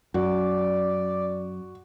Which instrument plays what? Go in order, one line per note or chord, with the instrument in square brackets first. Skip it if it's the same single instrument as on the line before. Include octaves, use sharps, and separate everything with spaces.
[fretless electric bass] F#2 [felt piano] F#4 [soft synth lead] D5